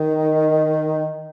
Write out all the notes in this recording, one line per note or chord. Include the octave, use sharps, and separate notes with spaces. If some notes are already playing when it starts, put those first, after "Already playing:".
Already playing: D#3